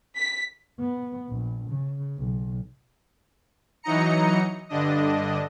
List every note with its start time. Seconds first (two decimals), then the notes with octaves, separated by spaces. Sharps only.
0.16 B6
0.79 B3
1.29 A#1
1.69 C#3
2.19 B1
3.83 E3 F#3 D#4 D#5 A#5 C#7
4.69 G2 D3 D4 D#5